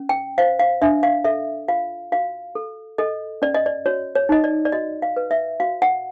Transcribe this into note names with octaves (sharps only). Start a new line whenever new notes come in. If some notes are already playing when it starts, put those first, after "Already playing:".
Already playing: C#4
G5
C5 F5
F5
D4 E5
F5
A4 E5
F4 F5
F#4 F5
A4
A4 D#5
C#4 D5
D#5
D5
F#4 C#5
C#5
D#4 D#5
D5
D5
F#4 D#5
F5
B4
E5
F#4 F5
F#5